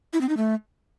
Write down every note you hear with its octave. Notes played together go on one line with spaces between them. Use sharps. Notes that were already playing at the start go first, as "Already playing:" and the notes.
E4
C4
D#4
A3